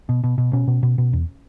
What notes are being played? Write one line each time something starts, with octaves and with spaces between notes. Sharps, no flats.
B2
B2
B2
B2 C#4
B2
B2
B2
E2